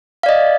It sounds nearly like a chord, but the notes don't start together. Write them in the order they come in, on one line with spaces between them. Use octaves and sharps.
F5 D5 D#5